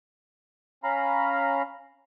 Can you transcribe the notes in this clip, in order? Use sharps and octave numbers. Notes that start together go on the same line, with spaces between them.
C#4 F5 A#5 B5